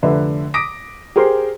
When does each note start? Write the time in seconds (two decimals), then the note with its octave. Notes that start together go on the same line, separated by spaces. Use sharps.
0.03 F1 D3 B4 E5
0.54 D6 D#6 A#6 B6 D7
1.16 G4 G#4 A#4 C5